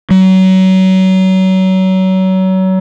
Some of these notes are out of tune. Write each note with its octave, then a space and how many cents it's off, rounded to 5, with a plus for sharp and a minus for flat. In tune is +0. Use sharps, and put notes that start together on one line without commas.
F#3 +30